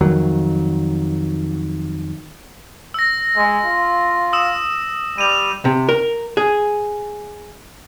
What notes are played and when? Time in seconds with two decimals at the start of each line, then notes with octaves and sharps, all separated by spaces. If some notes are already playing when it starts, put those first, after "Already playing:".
0.01 F2 D#3 F#3
2.94 E6 A#6
3.36 G#3
3.65 F4
4.33 D#6 E6 E7
5.18 G3 D#7 F7
5.65 C3
5.89 A#4
6.37 G#4